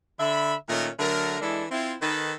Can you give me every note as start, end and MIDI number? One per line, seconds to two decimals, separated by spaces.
0.19 0.54 50
0.19 0.54 76
0.19 0.54 83
0.69 0.88 46
0.69 0.88 51
0.69 0.88 57
0.69 0.88 61
0.69 0.88 63
0.69 0.88 70
0.99 1.37 50
0.99 1.37 54
0.99 1.37 57
0.99 1.37 70
1.41 1.64 52
1.41 1.64 56
1.41 1.64 62
1.41 1.64 64
1.41 1.64 69
1.71 1.94 60
1.71 1.94 64
1.71 1.94 65
2.02 2.33 51
2.02 2.33 69
2.02 2.33 71